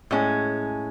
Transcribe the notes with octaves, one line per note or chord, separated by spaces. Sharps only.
A2 G#3 C#4